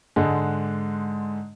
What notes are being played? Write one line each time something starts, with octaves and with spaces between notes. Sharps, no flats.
G#2 D3 G#3